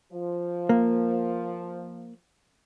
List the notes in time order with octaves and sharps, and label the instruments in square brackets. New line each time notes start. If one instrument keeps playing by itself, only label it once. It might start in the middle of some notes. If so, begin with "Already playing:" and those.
[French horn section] F3
[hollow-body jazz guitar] A#3